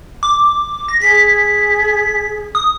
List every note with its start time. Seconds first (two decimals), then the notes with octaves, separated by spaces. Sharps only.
0.23 D6
0.88 A#6
1.01 G#4 B6
2.55 D#6